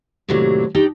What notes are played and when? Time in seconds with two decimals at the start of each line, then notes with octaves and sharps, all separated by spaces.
0.28 D#2 A2 C3 F#3 D4
0.75 D4 D#4 G4 G5